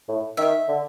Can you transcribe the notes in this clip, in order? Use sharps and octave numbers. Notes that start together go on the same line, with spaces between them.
A2
D#3 E5
D3